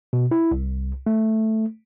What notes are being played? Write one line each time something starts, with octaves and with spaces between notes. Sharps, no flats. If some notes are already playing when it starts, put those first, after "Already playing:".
B2
E4
C2
A3